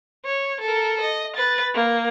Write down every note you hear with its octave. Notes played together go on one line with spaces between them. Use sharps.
C#5
A4 A#4
D#5
B4 A6
A#3